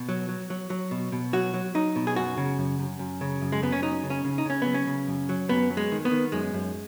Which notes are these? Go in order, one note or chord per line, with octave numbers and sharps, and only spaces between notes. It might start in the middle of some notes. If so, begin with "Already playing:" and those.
Already playing: B2
F#3
F#3
F#3
F#3
B2
B2
F#3 F#4
F#3
F#3 D#4
B2
G#4
F#2 F#4
C#3
F#2
F#2
F#2
C#3
F#2
G#3
F#2 B3
C#4
F#3 D#4
C#3
C#4
C#3
D#4
C#3 C#4
F#3 B3
C#4
C#3
F#2
F#3
F#2 B3
F#3
G#3
D#3
B3
D#3
F#2 G#3
F#2